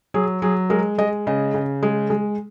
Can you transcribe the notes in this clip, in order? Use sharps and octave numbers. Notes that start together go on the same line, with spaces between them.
F#3 G#4
F#3 G#4
G#3 A#4
G#3 D#5
C#3 D#5
C#3
G#3
G#3